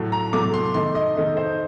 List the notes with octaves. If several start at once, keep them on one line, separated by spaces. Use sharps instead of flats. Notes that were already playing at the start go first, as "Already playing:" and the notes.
Already playing: A2 F#3 A3
A#5
A2 F#3 A3 D6
C6
D#3 A3 D#4 C6
D#5
D#3 A3 D#4
C5